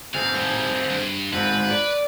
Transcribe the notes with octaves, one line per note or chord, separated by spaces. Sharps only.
C4 G#4 F5
D#3 G3
G2
G#2 C4 B4
D5